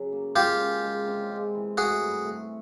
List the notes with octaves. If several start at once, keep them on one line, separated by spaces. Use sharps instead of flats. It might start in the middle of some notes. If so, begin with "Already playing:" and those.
Already playing: C#3 F#3
A#3
G#3 F4 G4
C#4
G#3
C3
G#3
E3
A3 F#4 G#4
G2
A3